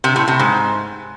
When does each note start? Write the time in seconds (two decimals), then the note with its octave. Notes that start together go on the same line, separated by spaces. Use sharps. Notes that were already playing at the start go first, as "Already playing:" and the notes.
0.04 C3
0.16 A2
0.28 C3
0.39 G#2